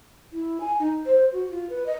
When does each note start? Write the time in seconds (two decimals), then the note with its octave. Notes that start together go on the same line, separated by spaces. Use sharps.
0.32 E4
0.60 G#5
0.80 D#4
1.06 C5
1.33 F#4
1.51 F4
1.70 B4
1.86 D#5